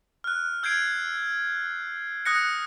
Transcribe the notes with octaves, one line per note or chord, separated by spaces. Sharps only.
F6 F#6
E6 G6 G#6 C7 D7
D#6 F#6 A#6 C#7